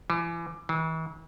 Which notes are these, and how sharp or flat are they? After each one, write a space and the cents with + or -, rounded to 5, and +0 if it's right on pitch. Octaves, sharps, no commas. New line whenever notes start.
E3 +35
E3 -40